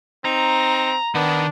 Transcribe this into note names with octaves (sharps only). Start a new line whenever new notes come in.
C4 D#4 A#5
D#3 B3 D4